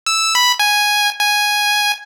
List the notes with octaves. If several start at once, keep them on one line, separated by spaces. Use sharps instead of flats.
E6
B5
G#5
G#5